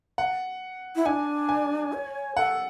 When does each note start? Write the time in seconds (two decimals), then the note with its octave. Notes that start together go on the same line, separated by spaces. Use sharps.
0.18 F#5
0.96 E4
1.06 D4 G#5
1.49 G#5
1.93 C#5
2.36 A4 F#5